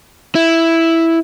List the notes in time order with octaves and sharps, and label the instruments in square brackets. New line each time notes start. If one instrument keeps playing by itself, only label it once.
[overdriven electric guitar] E4